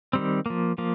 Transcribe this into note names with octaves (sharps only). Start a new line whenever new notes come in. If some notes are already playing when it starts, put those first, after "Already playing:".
D#3 G3 C4
F3 A#3
F3 A#3